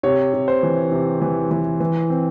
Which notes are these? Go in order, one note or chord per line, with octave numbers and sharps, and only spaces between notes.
C3 C#5
C3
C5
E3
C3
E3
E3
E3
C4